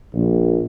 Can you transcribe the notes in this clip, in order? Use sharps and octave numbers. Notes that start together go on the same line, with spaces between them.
A#1